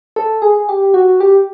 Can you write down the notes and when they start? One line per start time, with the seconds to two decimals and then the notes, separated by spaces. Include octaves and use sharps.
0.16 A4
0.42 G#4
0.69 G4
0.94 F#4
1.20 G4